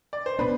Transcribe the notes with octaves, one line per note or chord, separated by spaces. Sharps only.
D5
C5
B2 B3 D4 B4